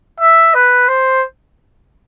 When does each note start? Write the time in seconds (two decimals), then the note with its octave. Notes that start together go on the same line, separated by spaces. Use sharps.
0.20 E5
0.54 B4
0.88 C5